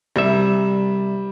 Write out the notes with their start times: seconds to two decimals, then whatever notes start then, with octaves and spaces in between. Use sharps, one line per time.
0.16 C2 G3 E5